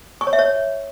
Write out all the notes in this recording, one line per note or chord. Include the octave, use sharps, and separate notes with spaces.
C#6
C#5
E5
C#5